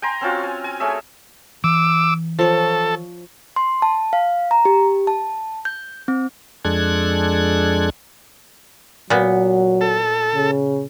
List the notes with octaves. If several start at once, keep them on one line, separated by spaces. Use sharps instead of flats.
G5 G#5 A#5 C6
C4 C#4 F4 F#4
G#5
G#5
A3 C#4 G#4 E5
E3 D6 E6
F3 A4 C#5
C6
A5
F5
A#5
G4
A5
G6
C4
F2 G#3 D4 A4 F#6 G#6
A#2 F#3 B3
A4
C#3